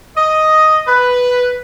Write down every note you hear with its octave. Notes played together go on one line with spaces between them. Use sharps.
D#5
B4